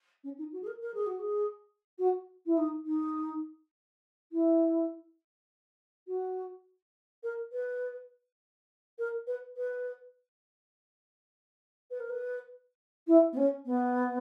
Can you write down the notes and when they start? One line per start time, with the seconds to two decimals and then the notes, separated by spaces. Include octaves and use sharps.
0.24 C#4
0.38 D#4
0.52 F#4
0.62 G#4
0.67 A#4
0.81 A#4
0.94 G#4
1.06 F#4
1.19 G#4
1.99 F#4
2.46 E4
2.57 D#4
2.86 D#4
4.32 E4
6.07 F#4
7.23 A#4
7.52 B4
8.99 A#4
9.27 B4
9.57 B4
11.91 B4
12.00 A#4
12.10 B4
13.07 E4
13.33 B3
13.37 C#4
13.66 B3